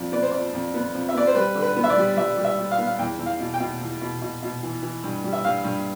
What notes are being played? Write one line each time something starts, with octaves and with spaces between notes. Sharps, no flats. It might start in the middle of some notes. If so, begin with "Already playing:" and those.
Already playing: F2 F3 D5
B3 D5
C5
F2 D5
F2
B3
F2
E5
B3 D5
C5
G3 B4
D3
B4
B3
E5
D5
G3
G3 E5
G3
E5
G3
F5
B3
F5
E2 G5
E2
F5
B2
G5
B2
E2
B2
B2
B2
E3
E3
G2
G3
E5
G2 F5
G2